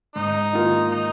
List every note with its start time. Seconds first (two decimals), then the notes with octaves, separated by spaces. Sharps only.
0.16 G#2 D#4
0.53 D#3 A#3 F4
0.92 D#4